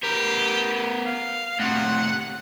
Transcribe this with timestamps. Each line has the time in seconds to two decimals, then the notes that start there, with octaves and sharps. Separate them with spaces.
0.03 B3 G4 A#4
1.06 F5
1.60 A2 C3 F#5